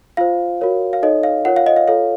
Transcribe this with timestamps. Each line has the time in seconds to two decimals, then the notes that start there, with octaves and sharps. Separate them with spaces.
0.17 F4 C5 F5
0.61 F#4 A#4 C#5
0.93 F5
1.03 D#4 A4 C#5 D#5
1.23 F5
1.45 F4 A#4 C#5 F#5
1.56 F5
1.67 D#5
1.76 F5
1.88 F4 A4 C#5 F5